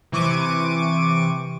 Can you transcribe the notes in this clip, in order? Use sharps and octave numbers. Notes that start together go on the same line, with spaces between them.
C3 E3 C#6 D6 D7 D#7